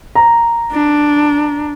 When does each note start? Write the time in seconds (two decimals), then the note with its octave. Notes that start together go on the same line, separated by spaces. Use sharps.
0.15 A#5
0.72 D4